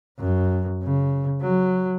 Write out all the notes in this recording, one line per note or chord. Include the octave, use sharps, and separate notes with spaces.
F#2
C#3
F#3